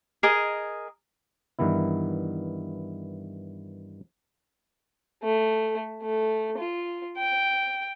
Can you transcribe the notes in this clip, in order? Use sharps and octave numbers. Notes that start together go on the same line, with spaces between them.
G#4 A#4 D#5
G2 D#3 E3 B3 E4
A3
A3
F4
G5